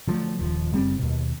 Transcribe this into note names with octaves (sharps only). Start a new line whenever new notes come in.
D3 F3 F#3 A3
D#1 D#2 F3
F#1 G3 C4
D#2 B2